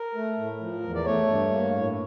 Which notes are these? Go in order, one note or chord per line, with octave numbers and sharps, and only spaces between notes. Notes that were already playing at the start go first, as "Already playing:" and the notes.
Already playing: A#4
A3
A2
F3
E2
D5
A3 C#5
G2
A#3
A2